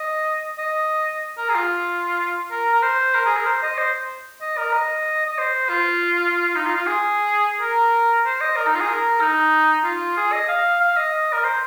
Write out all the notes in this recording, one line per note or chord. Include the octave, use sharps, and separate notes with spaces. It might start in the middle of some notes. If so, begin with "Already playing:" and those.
Already playing: D#5
D#5
A#4
G#4
F4
A#4
A#4
C5
A#4
G#4
A#4
C5
D#5
C5
D#5
A#4
D#5
D#5
C5
F4
D#4
F4
F4
G#4
A#4
C5
D#5
A#4
D#4
F4
G#4
A#4
D#4
F4
G#4
D#5
F5
F5
D#5
A#4
C5